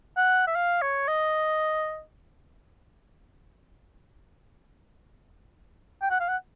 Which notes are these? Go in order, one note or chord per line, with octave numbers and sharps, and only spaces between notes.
F#5
E5
F5
C#5
D#5
G5
F#5
F5
F#5